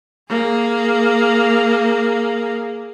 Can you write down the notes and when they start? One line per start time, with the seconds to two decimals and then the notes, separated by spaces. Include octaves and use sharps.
0.29 A#3 G#4